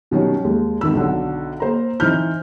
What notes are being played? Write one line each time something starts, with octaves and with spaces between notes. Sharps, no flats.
B2 D#3 F#3 G3 C#4
D#2 G#3
G#1 D#3 E6
B1 D3 F#3
A#3 C5 A#5
E3 C4 D#4 F6 G6